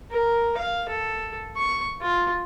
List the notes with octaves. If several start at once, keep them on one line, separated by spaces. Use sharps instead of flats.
A#4
F5
A4
C#6
F4